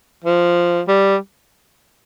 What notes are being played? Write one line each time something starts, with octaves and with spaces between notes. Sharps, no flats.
F3
G3